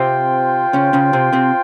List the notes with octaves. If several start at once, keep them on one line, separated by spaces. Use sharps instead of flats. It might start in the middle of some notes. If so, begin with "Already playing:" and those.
Already playing: C3 C4 F4 C5 G5
C#3 C#4
C#3 C#4
C3 C4
C3 C4